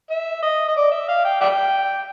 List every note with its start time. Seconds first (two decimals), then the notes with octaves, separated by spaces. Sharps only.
0.10 E5
0.42 D#5
0.68 D#5
0.76 D5
0.91 E5
1.08 F5
1.25 G5
1.41 D5 E5 G5